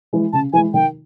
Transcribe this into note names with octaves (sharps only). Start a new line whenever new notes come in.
E3 G#3
C#3 A5
E3 G#3 G#5
D#3 G5